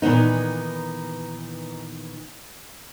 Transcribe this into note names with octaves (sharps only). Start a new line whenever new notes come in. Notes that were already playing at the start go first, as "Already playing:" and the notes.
A#2 D#3 E3 B3 D#4